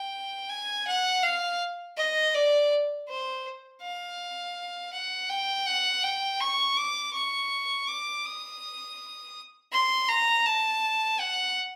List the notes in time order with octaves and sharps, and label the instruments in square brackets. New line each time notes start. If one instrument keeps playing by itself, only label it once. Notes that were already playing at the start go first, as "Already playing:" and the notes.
Already playing: [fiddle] G5
G#5
F#5
F5
D#5
D5
C5
F5
F#5
G5
F#5
G5
C#6
D6
C#6
D6
D#6
C6
A#5
A5
F#5